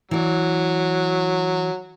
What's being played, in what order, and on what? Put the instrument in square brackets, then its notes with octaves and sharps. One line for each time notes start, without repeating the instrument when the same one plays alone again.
[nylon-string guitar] E3 D5 [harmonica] F#3